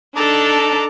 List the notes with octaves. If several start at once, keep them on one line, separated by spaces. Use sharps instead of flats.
D4 D#4 A4 A5 A#5 D6